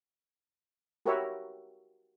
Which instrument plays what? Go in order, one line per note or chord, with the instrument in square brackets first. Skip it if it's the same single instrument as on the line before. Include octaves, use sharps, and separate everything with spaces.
[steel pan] F#4 G4 A#4 B4 C#5 E5